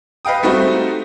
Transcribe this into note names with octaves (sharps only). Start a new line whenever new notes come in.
B4 D#5 F5 G5 D#6
G3 A3 C4 D#4 F#4